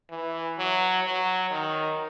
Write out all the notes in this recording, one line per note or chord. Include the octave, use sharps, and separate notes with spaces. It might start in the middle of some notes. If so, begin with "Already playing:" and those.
E3
F#3
F#3
D#3